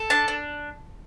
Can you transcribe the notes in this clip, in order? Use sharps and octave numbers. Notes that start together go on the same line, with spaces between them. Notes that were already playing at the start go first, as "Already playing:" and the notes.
Already playing: A4
D4 A5
D4